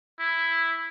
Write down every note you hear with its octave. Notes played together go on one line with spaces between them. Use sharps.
E4